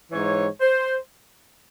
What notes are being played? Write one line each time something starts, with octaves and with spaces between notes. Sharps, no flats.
G#2 E3 C#5
C5